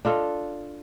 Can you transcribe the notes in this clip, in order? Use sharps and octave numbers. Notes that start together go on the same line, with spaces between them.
D4 F4 A4 D#5